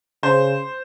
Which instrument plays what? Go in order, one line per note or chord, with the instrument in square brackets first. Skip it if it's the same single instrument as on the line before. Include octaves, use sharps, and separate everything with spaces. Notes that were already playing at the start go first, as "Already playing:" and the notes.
[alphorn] C#3 [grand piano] C5